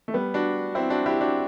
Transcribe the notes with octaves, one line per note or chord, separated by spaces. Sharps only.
A3
G3 B3
D4 F#4
C4 E4
D4 F#4
E4 G4
D4 F#4